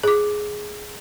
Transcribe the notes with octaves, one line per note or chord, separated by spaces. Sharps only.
G#4 D6